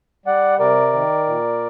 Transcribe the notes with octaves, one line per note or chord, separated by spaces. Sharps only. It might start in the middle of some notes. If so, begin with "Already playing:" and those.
G3 D5 F#5
C3 A#4 D5
D#3
A#2